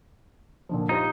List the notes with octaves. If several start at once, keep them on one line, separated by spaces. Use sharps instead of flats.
A#2 D3 F3
D#4 F4 G4 C5